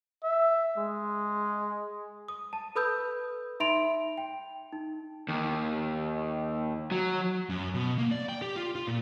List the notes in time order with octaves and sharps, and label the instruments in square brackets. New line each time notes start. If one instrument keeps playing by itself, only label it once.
[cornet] E5
G#3
[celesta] D#6
A5
A4 B4 B5 D#6 E6 G6
D#4 E5 B5 C6 D7 F7
G5
D#4
[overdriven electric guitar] D#2
F#3
[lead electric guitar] F#2
B2
A#3
D5
G5
G4
F4
F4
A#2